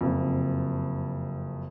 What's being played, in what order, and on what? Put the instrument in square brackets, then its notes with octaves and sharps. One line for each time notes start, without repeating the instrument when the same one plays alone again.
[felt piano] F#1 F2